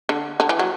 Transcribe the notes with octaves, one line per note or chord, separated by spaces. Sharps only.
D3
D3
E3
F#3